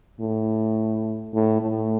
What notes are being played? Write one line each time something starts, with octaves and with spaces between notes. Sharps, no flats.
A2
A2
A2